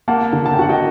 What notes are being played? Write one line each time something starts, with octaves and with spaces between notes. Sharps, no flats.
A#3 F#5 A5
D3
A5
G5
F#4 F#5
D#5 G5